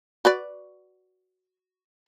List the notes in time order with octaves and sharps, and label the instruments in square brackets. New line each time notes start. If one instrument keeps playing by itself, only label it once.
[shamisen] F#4 B4 D5